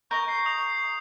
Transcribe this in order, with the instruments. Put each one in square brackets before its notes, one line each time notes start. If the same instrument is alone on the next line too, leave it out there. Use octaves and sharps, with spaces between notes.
[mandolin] A#4 D#5 A#5 [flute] C#6 [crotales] G6
[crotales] C7
D#6 F7